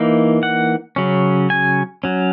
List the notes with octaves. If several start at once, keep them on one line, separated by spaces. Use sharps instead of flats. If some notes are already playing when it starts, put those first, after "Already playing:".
Already playing: E3 A#3 D#4
F#5
C#3 F#3 C#4
G#5
F#3 C#4